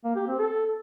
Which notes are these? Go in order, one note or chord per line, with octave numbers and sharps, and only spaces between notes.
A#3
G4
C4
A4